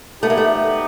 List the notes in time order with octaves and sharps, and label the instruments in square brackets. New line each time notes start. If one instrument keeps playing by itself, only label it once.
[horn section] E3 G3 B3 D#4 G4 [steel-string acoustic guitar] A3
[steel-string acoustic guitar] A#3
A3